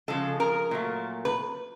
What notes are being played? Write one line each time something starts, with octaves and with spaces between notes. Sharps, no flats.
C#3 F3 G#3 A4
A#4
A#2 F#3 A3
B4